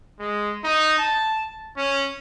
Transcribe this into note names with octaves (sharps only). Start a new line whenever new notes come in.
G#3
D#4
A5
C#4